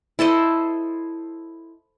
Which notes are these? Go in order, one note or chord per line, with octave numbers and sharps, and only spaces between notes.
E4 A4 C5 D#5